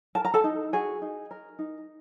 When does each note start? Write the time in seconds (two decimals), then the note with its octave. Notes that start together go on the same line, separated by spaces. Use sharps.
0.15 A#4 A5
0.25 A#5
0.34 A4 A5
0.44 D#4
0.73 F#4 G#4 G#5
1.02 D#4
1.31 A#4
1.59 D#4